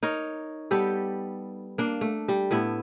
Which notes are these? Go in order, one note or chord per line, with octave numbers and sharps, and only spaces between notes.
D#4 A#4 C#5
G3 B3 G4 A4
A#3 D4
A3
G3
A2 B3 E4